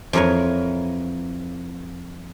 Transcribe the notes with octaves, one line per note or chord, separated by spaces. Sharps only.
F2 E3 A#4 B4 C#5